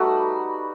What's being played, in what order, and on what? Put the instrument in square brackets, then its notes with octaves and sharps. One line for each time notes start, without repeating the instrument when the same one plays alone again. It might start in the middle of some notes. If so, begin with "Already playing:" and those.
Already playing: [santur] G3 A3 D#4 F#4 B4